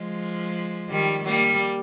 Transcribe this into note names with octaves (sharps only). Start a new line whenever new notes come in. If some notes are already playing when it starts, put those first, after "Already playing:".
Already playing: F3 G#3
D#3 G3
G3 A#3